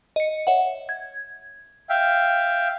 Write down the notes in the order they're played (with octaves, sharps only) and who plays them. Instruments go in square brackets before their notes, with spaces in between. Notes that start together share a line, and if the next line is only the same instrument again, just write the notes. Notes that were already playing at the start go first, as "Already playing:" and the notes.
[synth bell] D#5 C#7
C#5 E5 F#5
G#6
[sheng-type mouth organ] E5 F5 G5